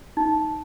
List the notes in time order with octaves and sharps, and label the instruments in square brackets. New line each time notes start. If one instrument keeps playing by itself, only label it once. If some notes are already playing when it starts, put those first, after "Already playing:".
[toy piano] D#4